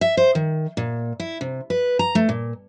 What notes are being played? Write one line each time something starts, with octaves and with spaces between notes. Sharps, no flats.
E5
C5
D#3
A#2
E4
C3
B4
A#5
A3
A#2